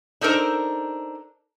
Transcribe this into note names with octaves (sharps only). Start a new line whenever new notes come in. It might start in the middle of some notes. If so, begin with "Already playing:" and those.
D4 D#4 A4 A#4 C5